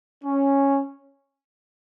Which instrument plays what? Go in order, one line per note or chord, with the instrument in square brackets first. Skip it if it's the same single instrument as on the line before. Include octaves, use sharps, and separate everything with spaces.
[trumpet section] C#4